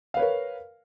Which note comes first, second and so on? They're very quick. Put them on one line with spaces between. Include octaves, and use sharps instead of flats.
F5 B4 C#5 A#4